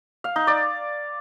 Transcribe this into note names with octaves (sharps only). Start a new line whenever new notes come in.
F5
D#4
D5